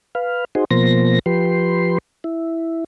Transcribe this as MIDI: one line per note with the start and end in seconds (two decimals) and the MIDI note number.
0.15 0.45 71
0.15 0.45 77
0.55 0.65 63
0.55 0.65 66
0.55 0.65 68
0.55 0.65 72
0.71 1.19 47
0.71 1.19 53
0.71 1.19 58
0.71 1.19 72
0.71 1.19 94
1.26 1.98 53
1.26 1.98 67
1.26 1.98 71
1.26 1.98 84
2.24 2.84 64